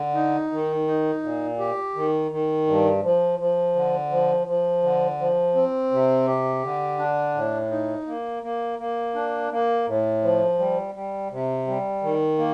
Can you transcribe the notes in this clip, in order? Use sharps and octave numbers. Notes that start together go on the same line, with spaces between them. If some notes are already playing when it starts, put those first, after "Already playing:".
Already playing: D3
D#4
D#3
D#4
A#2
G4
D#3
D#3
G2
F3
F3
D3
F3
F3
D3
F3
C4
C3
G4
D3
D4
A2
D#4
A#3
A#3
A#3
D4
A#3
A2
F3
G3
G3
C3
G3
D#3
A#3